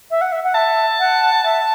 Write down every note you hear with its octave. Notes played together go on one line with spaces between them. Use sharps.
E5
F#5
E5
F#5
E5 A5
F#5
E5 A5